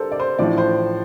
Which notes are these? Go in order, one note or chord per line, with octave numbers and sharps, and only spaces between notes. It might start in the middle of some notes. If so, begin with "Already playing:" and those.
Already playing: G3 A4 A#4 C5 D5
D5
C5
A1 A2 F3 D5
C5